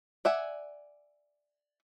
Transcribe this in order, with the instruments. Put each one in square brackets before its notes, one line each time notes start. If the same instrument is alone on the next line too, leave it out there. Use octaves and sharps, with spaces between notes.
[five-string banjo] D5 E5 F#5 G#5